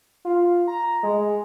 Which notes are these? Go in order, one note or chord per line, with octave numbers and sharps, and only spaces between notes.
F4
A#5
G#3